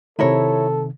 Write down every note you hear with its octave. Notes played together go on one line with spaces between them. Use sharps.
C3 D#3 E4 A4 A#4 C#5